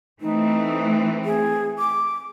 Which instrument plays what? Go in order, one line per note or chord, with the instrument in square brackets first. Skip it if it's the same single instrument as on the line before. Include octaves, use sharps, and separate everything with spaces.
[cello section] E3 A3 C4 [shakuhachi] D#4
[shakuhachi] G#4
D6